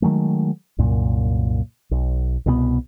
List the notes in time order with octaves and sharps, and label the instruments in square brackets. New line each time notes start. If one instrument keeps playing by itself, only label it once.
[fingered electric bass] D#3 F#3 G#3 A3
C2 F#2 A#2
B1
C2 B2 E3 B3